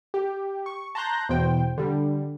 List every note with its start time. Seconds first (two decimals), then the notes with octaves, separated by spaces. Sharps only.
0.14 G4
0.66 C#6
0.95 A5 A#5 C6 F#6 G6 A#6
1.29 E2 B2 C5 G5
1.78 D3 G3